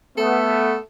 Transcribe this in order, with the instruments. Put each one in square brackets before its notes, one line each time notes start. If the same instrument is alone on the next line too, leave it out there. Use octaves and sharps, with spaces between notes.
[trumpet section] A3 B3 [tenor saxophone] A4